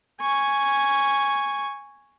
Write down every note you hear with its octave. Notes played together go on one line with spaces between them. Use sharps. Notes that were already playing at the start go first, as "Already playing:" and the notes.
G#5 C#6